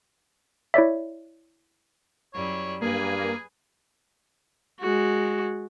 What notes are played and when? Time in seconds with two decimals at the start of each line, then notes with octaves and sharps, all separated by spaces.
0.74 E4 C#5 D5 E5
2.34 F#2 G3 E4 C#5
2.82 G2 A#3 G#4 B4 G#5
4.80 G#3 F#4